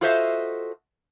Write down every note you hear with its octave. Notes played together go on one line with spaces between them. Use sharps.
F4 F#4 A4 C5 D#5 E5